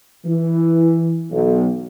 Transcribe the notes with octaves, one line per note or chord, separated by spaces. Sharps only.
E3
B1